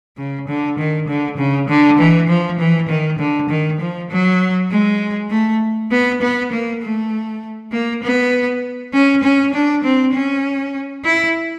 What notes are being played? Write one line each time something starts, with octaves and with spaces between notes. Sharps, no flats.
C#3
D3
D#3
D3
C#3
D3
E3
F3
E3
D#3
D3
D#3
F3
F#3
G#3
A3
B3
B3
A#3
A3
A#3
B3
C#4
C#4
D4
C4
C#4
E4